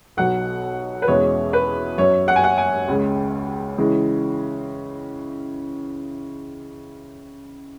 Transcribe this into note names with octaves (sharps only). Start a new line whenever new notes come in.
B1 B2 F#3 F#5
B4
E2 B2 G#3 C#4 C#5
B4
F#2 F#3 C#4 C#5
F#5
G#5
F#5
G#5
C#2 C#3 G#3
C#3 E3 G#3